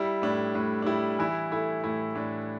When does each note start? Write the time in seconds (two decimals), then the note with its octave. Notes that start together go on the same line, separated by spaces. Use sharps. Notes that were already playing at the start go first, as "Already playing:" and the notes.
Already playing: G3 E4
0.22 A2 D4
0.55 A2 D4
0.82 D4
0.86 G3 E4
1.19 E3 E4
1.51 A3 E4
1.84 A2 E4
2.15 A2 D4